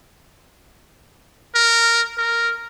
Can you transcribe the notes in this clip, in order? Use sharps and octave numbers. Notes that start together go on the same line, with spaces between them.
A#4
A#4